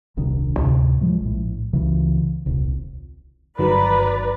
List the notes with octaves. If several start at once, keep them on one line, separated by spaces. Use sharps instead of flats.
D#1 C2 D#3 D4
D2 A2 C3
F3 G#3
A#1 A2
C#2 C#3 E3
D#1 C2
G1 D#3 F#3 B4 D5 A#5